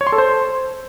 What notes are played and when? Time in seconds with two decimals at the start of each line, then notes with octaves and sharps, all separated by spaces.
0.01 C#5
0.07 C6
0.12 A4
0.18 C5